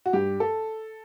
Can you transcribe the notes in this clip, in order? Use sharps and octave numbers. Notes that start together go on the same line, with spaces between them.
F#4
G2 G4
A4